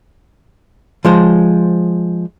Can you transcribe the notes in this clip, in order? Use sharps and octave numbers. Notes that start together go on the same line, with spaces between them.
F3 G#3 C5